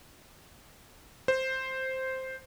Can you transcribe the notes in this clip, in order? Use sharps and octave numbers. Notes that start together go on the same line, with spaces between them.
C5